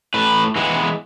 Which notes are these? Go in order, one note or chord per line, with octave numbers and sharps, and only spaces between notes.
A2 B4
E3 G#3 B3